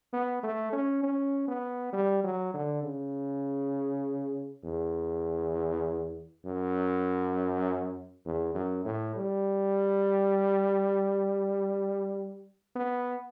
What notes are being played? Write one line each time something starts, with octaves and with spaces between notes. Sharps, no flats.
B3
A3
C#4
C#4
B3
G3
F#3
D3
C#3
E2
F#2
E2
F#2
A2
G3
B3